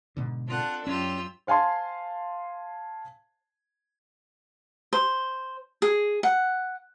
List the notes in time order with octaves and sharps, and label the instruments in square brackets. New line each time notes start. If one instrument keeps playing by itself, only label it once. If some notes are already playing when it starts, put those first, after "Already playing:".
[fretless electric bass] G#2 B2 D3
[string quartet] C4 D4 A4 [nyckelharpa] F4 F#5
[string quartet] F#2 E6 [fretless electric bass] C#4 [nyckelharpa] F4 G4
[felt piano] C5 F5 G#5 A5 C6
[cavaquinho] C5
G#4
F#5